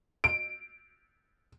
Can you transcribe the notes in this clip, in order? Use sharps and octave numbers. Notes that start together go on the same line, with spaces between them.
D7